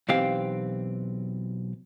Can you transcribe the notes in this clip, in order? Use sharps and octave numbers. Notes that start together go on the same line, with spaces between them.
B1 E3 C4 G4 F5